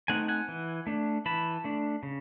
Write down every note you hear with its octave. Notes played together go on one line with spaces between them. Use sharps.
A3 C4 D#4 F#5 G#5
F#5 G#5
E3
A3 D4
E3 A5 B5
A3 D4
C#3